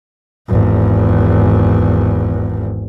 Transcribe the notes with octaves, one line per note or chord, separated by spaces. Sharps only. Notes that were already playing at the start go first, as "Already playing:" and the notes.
G#1 E2